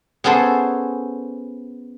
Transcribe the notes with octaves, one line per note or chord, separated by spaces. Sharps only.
B3 C#4 G#4 A4 C5